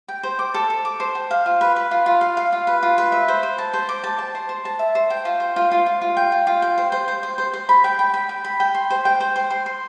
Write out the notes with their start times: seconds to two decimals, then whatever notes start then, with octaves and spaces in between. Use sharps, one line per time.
0.08 G5
0.23 C5
0.39 D6
0.54 A4
0.70 A4
0.85 D6
1.00 C5
1.15 G5
1.31 F5
1.46 F4
1.61 B4
1.76 B4
1.91 F4
2.06 F4
2.21 F5
2.37 F5
2.52 F4
2.67 B4
2.83 F4
2.98 B4
3.12 E5
3.28 C5
3.43 C5
3.58 A5
3.73 C5
3.89 D6
4.04 A5
4.18 A5
4.35 C5
4.49 C5
4.65 A5
4.79 E5
4.95 C5
5.10 G5
5.25 F4
5.40 C5
5.56 F4
5.71 F4
5.86 F4
6.01 F4
6.17 G5
6.32 F4
6.47 F4
6.62 G5
6.78 C5
6.92 C5
7.08 C5
7.23 C5
7.38 C5
7.53 C5
7.69 B5
7.84 G5
7.99 G5
8.14 B5
8.29 G5
8.44 B5
8.60 G5
8.74 C6
8.90 C5
9.05 G5
9.20 C5
9.36 C5
9.50 C6
9.66 C6